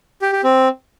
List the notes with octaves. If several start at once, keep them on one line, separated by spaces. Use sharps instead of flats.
G4
G4
C4